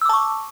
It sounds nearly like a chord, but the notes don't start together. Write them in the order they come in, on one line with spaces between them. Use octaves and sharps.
E6 D6 A5 C#6